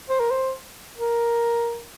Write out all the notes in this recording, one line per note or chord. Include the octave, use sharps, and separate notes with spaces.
C5
A#4
C5
A#4